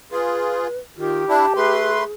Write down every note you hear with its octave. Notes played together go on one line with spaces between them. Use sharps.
F4 G#4 B4
D#3 F4 G4
D4 E4 A5
A3 G#4 B4 C6